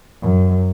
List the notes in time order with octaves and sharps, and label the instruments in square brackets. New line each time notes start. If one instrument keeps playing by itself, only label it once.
[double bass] F#2